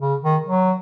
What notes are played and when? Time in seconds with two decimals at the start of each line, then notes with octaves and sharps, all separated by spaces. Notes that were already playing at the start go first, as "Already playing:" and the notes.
0.01 C#3
0.24 D#3
0.44 F#3